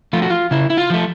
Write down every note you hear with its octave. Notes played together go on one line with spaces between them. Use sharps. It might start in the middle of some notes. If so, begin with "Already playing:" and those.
F3 A3 F4
F#4
F4
C#3 E4
E4
F4
F3 A3